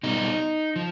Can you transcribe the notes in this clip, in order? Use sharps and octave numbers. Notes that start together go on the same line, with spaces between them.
B2 G3 D#4
F3